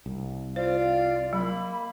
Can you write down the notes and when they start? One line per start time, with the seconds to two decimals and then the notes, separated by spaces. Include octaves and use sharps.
0.06 C2
0.56 F4 C5 D5 F5
1.33 F#3 A#3 B5